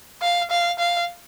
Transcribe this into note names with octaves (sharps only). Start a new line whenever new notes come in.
F5
F5
F5